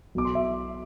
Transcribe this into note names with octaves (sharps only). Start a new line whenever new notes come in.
B1 B2 D6
C6
E5